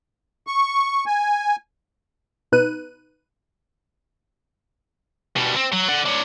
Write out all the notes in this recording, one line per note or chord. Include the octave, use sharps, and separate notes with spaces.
C#6
G#5
B2 B3 D#4 B4 F#6 D#7
B2 G3
C4
F#3
D5 F#5
D4 C#5